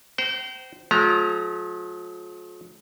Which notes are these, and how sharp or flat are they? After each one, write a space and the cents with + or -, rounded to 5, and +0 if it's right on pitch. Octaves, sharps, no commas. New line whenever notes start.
C5 -15 G5 -40 A#5 +0
F3 +40 A3 -45 A#5 +0